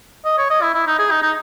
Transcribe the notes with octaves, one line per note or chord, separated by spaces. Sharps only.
D#5
C#5
D#5
E4
E4
D#4
G#4
D#4
D#4